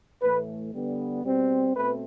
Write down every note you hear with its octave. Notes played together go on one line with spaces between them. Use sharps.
A2 E3 A3 B4
D3 G3 B3
B2 G3 C4
B2 A3 C4 B4